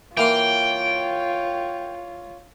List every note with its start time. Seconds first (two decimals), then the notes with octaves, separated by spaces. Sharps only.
0.17 E3 A#3 F4 C#5 G5 C6